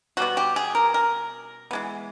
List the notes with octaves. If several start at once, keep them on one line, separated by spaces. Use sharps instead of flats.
B2 G3 B3 F#4
G4
G#4
A#4
A#4
E3 G#3 B3